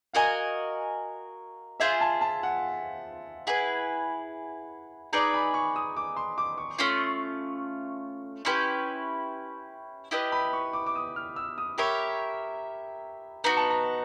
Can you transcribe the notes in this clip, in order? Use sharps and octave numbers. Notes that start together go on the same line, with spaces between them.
F#4 A#4 D#5 F5 G#5
F4 G#4 C5 E5
A5
A5
F#5
E4 G#4 B4 F#5
D#4 G#4 B4 D5 A#5
B5
C#6
D#6
D6
C6
D6
C#6
A3 C#4 F4
C#4 E4 G4 B4 C6
E4 G4 B4 D#5
B5
C#6
D6
D6
D#6
F6
E6
D#6
G4 A#4 C#5 E5 B5
B3 D#4 F#4 A#5
A5
A#5